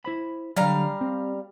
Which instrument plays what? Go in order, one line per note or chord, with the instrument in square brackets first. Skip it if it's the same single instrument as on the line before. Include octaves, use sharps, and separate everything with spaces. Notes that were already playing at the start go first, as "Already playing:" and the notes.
[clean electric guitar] E4 C5 B5
[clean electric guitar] D3 F#3 [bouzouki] G3 F5 A#5
[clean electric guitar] C4